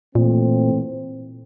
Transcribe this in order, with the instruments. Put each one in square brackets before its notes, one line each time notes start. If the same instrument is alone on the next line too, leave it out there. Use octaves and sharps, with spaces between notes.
[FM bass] A#2 [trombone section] E3 A3 C4